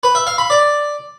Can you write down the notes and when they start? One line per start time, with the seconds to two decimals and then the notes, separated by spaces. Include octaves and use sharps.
0.03 B4
0.15 E5
0.27 F5
0.38 B5
0.50 D5